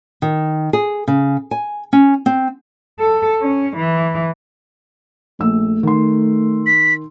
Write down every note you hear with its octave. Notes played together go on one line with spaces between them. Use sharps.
D#3
G#4
C#3
G#5
C#4
C4
A4
C#4
E3
A#1 A3 E6
D#3 C6
B6